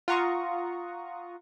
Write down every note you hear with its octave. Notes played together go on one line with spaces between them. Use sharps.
F4 F#5 A#5 C#6 D#6